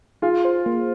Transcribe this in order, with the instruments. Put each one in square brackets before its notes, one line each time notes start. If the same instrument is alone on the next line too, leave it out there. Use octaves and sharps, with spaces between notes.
[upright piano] F4 [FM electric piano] G#4
[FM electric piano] C5
A#3